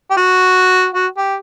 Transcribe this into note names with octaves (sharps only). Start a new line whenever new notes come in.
G4
F#4
F#4
G4